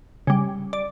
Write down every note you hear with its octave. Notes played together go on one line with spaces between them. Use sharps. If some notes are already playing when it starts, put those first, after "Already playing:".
C#3 G3
D5